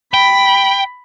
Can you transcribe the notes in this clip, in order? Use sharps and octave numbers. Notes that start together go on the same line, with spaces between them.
G5 B5